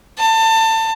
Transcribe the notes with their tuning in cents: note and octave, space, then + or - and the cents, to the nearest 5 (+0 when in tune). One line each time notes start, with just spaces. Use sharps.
A5 +25